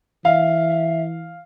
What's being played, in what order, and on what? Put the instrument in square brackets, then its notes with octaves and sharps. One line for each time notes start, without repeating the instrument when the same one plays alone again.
[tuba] E3 [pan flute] E5 [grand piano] F5